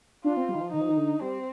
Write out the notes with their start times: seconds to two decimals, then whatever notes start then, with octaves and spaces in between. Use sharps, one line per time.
0.24 D4 F4
0.37 C4
0.49 G3
0.55 D#3
0.61 F3
0.73 D#3 D#4
0.81 F3
0.89 D#3
0.97 D3
1.21 G3 C4